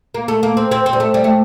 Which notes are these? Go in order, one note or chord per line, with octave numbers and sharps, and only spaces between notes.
A#3
A3
A#3
C4
C4
C4
G3
A3
G3
A3